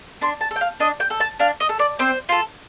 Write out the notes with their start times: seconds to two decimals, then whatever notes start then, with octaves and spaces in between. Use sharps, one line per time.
0.21 D4 C6
0.41 A5
0.51 A4
0.56 G5
0.61 F5
0.80 D4 D#5
1.00 G5
1.10 A4
1.20 A5
1.40 D4 F5
1.60 D#5
1.69 A4
1.79 D5
1.99 C4 C5
2.29 F4 A4